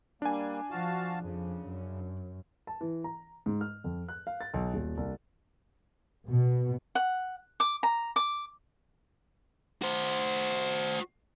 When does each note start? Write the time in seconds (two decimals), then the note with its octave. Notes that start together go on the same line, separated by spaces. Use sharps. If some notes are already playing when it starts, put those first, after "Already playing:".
0.22 G3 A#3 D4 G#5
0.71 F3 F#4 F5 A5
1.20 F2 C#3
1.66 F#2
2.67 A5
2.81 E3
3.04 A#5
3.46 G#2
3.61 F6
3.84 F2
4.09 F#6
4.27 F5
4.41 A6
4.54 B1
4.74 D#1
4.97 C2
6.29 B2
6.95 F#5
7.60 D6
7.83 A#5
8.16 D6
9.82 F#4 C5